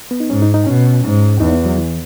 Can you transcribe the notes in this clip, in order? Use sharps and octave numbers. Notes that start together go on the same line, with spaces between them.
B3
D#4
G#2 C#4
D#4
D#4
B2 C#4
G#2
E2 D#4
B3
F#3
E3